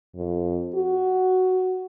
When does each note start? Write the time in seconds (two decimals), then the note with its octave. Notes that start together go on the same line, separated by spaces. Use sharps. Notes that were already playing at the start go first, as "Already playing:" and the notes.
0.15 F2
0.75 F#4